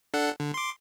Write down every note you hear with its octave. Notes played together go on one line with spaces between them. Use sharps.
D4 A4 F#5
D3
C6 D6